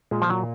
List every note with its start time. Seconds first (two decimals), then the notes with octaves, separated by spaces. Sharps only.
0.11 A#2 G#3
0.22 F3
0.30 F#3